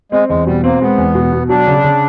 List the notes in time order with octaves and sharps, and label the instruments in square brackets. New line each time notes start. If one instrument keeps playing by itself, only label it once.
[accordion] G#3 [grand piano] C4
[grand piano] E2 [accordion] G#3
[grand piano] B2 [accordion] G3
[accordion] A#3 [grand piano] C4
[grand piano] G#3 [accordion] B3
[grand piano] E2
B2
B2
[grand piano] F#3 [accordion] D4
[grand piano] C#3
C#3